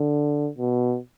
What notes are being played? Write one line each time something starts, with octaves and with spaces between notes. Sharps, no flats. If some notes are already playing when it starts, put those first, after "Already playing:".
Already playing: D3
B2